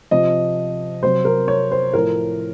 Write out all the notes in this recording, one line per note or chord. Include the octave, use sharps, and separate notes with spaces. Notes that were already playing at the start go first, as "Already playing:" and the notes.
C3 F3 D#5
C3 F#3 C5
A#4
C#5
C5
A2 F3 A#4